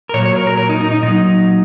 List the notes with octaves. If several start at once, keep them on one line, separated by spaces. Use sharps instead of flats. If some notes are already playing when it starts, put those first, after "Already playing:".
A#4
A#2 F#3 C#5
C#5
A#4
A#4
A#4
D#4
D#4
D#4
A#2 F#3 D#4